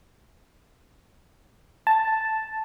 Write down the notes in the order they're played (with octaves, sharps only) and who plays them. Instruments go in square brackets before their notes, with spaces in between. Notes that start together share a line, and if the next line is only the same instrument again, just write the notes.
[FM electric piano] A5